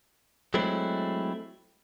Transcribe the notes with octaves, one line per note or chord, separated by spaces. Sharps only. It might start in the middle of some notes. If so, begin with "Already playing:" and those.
F#3 G#3 A3 C4 E4